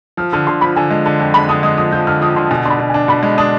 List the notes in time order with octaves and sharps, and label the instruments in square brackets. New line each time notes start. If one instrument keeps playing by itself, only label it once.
[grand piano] F3 [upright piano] F6
[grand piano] D3 [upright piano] F6
[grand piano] D3 [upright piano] C6
[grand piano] F3 [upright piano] B5
[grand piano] D3 [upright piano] G#5
[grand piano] G#3
D3
F2
[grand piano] G#3 [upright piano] B5
[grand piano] D3 [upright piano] D#6
[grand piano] G#3 [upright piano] D#6
[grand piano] F3 [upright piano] D#6
[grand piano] F3 [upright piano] G6
[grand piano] D3 [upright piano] F6
[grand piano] F3 [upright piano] D#6
[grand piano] D3 [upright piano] C6
[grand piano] B2 [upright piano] G#5
[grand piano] D4 [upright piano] C6
[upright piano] B5
[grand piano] B2
[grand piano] D4 [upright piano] G#5
[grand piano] B2 [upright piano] B5
[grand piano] G#3
[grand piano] D4 [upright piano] D#6